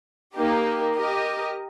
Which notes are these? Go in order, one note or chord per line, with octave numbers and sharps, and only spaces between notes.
A#3 D#4 G4
G4 A#4 D#5